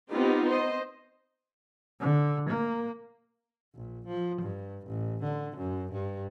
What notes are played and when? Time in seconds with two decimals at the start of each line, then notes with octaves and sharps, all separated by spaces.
0.11 B3 C4 D#4 F4 G4
0.51 C5 D#5
2.00 D3
2.49 A#3
3.75 A#1
4.08 F3
4.42 G2
4.87 A1
5.23 D3
5.57 F#2
5.92 G2